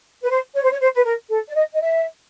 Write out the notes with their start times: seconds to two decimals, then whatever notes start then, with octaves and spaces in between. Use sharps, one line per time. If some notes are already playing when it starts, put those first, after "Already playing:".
0.24 B4
0.30 C5
0.54 C#5
0.63 C5
0.71 C#5
0.80 C5
0.96 B4
1.04 A#4
1.30 A4
1.49 D5
1.54 D#5
1.74 D#5
1.81 E5